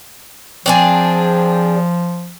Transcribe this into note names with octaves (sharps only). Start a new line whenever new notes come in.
F3 C4 D4 G#4